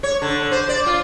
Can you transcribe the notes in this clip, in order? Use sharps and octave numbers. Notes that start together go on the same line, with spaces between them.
C#5
D3
C5
D5
F4